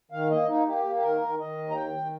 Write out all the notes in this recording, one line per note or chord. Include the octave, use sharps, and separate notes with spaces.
D#3 F5
A#3 D#5
A#3 D#4
A#3 G4
A#3
G4
D#3 A#4
D#3
D#3 D#5
D#2
A#5
D#3 G5
D#3